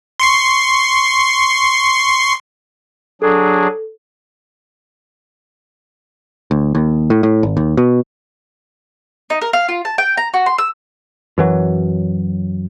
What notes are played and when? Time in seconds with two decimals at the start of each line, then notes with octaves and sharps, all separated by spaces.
0.20 C6 C#6 C7
3.22 F#3 D4 G#4 A4
6.51 D2
6.75 D#2
7.10 A2
7.23 A2
7.43 G#1
7.57 D#2
7.77 B2
9.30 D#4
9.42 A#4
9.53 F5
9.69 F4
9.85 A5
9.98 G5
10.17 A#5
10.34 F#4
10.46 C6
10.58 E6
11.38 F#2 E3 F#3